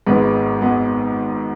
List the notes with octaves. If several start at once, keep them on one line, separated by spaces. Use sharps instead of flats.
G#1 G#2 G#3 B3 B4
G#3 B3